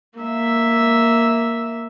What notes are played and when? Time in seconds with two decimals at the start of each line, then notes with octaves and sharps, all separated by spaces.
0.19 A#3 E5